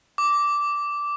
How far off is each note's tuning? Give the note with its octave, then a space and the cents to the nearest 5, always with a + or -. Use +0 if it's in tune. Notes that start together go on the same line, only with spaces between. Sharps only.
D6 -10